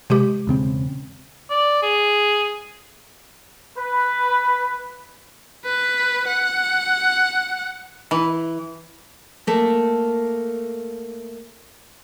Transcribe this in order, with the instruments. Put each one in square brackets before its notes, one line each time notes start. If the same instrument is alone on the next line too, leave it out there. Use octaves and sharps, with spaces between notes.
[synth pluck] C3 G#3 G4
[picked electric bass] E1 C#3 C4
[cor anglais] D5
G#4
[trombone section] B4
[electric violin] B4
F#5
[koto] E3
[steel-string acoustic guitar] A3 A#3